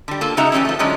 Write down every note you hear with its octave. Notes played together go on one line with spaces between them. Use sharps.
D3 G3
A#3 F4 A4 A5
C#3 G#3 D#4 F#4 E5 A#5
E3 G3 C#4 D#4 E4
F3 A3
D3 F3 F#3 G#3 C#4 D4